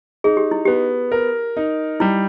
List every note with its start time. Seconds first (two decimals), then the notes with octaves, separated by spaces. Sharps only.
0.24 D#4 G#4
0.37 G4
0.51 E4
0.65 B3 G4
1.12 A#4
1.57 D#4
2.00 G3 E4